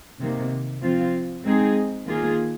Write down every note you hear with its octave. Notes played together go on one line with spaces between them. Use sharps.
C3 D#3 A#3
F3 C4 F4
G#3 C4 D#4 G#4
D#3 A#3 F4 G#4